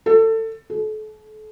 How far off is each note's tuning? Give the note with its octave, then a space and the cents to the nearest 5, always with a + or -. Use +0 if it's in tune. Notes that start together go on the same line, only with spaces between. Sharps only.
A4 +25
A4 -35